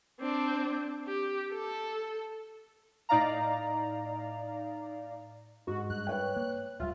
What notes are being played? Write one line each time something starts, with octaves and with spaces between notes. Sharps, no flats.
C4 D4
G4
A4
A2 D#4 D5 F5 A#5
G#2 F#4
G2 F#6
B4 C#5 G5
A#3
D1 G3 F4 E5 F5